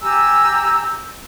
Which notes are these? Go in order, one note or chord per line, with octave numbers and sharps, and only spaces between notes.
G4 G#5 A#5 E6